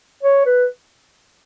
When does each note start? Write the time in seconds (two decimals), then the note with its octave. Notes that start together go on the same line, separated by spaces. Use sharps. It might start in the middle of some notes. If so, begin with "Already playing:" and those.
0.23 C#5
0.46 B4